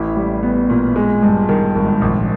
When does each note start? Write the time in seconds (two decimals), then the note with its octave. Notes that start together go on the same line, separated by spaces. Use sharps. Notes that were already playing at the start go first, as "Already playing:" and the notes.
Already playing: A1 E4
0.16 G3
0.43 B3
0.69 A#2
0.96 G#3
1.22 G2
1.49 D#3
1.75 G#1
2.01 A#1